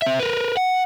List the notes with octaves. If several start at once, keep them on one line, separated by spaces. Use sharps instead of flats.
C4 E5
A#4 B4
F#5